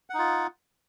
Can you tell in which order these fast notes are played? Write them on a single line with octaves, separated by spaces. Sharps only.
F#5 D#4 F4